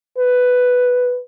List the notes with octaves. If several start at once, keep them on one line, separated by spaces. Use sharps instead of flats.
B4